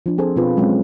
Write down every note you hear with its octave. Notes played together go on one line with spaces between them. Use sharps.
F3 D4
C4 G#4 A4 C5
B2 C4 F4 B4
F#3 G#3 C4 C#4
F#3